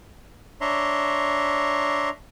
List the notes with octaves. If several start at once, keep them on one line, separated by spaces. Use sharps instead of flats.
D4 C#5 E5 A#5 C6